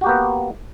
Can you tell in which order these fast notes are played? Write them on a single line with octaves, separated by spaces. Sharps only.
F#4 G4 A#3 B3